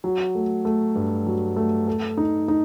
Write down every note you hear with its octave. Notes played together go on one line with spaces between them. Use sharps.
F#3
A3
A3
G2
F#3
A3
A4
D#4
D#4